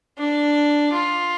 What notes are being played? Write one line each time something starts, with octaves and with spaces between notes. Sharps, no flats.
D4
F4